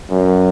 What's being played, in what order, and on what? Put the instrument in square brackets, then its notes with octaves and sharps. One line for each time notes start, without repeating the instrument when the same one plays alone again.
[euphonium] F#2